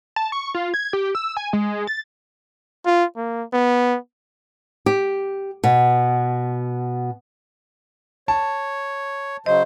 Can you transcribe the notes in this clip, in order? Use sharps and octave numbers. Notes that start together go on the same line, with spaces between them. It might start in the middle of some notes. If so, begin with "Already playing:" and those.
A5
C#6
F4
G#6
G4
E6
G#5
G#3
A6
F4
A#3
B3
G4
B2
C#5 A5
C#3 F#3 C5 D#5